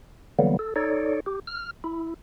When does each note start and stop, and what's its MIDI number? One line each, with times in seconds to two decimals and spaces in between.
0.39 0.57 50
0.39 0.57 52
0.39 0.57 54
0.39 0.57 55
0.39 0.57 58
0.39 0.57 59
0.59 0.74 69
0.76 1.20 63
0.76 1.20 69
0.76 1.20 73
0.76 1.20 74
1.26 1.40 67
1.47 1.71 89
1.84 2.14 64